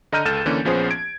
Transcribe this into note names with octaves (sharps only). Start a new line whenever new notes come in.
D3 D#5 A#5 F6 G6 D#7
C#2 A4 F6 A6 E7
D3 E3 A#3 C#4
A#1 F3 B3 C#4 G#4 C5
G#6 D7